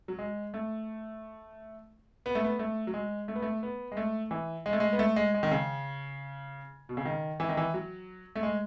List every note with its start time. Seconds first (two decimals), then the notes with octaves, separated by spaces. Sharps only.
0.08 F#3
0.19 G#3
0.54 A3
2.26 B3
2.35 A3
2.44 B3
2.59 A3
2.87 F#3
2.94 G#3
3.28 A3
3.35 B3
3.42 A3
3.63 B3
3.92 G#3
3.97 A3
4.31 E3
4.66 G#3
4.73 A3
4.80 G#3
4.93 B3
4.99 A3
5.16 G#3
5.34 G#3
5.43 D#3
5.51 C#3
6.89 B2
6.97 C#3
7.05 D#3
7.40 E3
7.49 D#3
7.57 E3
7.74 F#3
8.36 A3
8.43 G#3